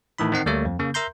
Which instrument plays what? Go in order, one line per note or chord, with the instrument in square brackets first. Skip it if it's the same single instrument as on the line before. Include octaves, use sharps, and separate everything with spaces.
[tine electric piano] A2 D#3 E3 B5
D#3 C4 F#5 C7
D2 G3 A3 A#3 C#5
F2
C#3 A#3
A#4 E5 A#5 C6 G6